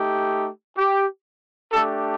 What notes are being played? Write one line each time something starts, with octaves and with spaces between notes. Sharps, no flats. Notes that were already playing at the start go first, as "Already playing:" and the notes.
Already playing: A3 D#4 G4
G4
A3 D4 G4 A4